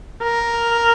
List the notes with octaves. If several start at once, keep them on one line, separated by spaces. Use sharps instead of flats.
A#4